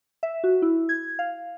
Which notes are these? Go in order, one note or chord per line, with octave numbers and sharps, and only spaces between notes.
E5
F#4
E4
G#6
F5